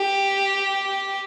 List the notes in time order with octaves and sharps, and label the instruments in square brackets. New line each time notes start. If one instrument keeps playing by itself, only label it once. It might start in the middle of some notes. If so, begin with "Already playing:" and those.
Already playing: [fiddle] G4